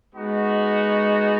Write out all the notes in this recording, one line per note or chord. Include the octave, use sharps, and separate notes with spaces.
G#3 B3 D#4 F#4